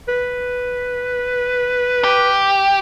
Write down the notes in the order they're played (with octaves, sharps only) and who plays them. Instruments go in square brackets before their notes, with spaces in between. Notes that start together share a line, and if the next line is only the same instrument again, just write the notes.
[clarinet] B4
[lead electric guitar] G4